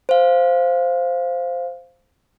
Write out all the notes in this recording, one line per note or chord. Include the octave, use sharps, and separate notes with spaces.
C5 F5